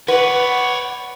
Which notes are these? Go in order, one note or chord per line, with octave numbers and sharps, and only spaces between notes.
B4 C#5 D5 F#5